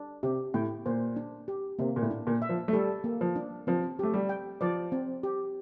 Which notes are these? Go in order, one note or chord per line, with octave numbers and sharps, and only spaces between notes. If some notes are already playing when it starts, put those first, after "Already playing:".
Already playing: D4
C3 G4
A2 G5
A#2 C5
D4
G4
C3 A#3
A#2
A2
D4
A#2
E5
F3
A3
G3 A4
A#3
F3
D4
F3 C4
A3 G4
G3
G5
F3 D5
C4
G4